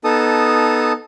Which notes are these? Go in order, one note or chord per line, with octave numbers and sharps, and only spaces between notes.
B3 D#4 A4 A5 D#6